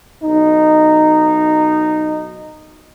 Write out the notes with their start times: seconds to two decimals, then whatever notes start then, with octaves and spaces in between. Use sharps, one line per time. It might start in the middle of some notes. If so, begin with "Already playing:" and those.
0.22 B1 D#4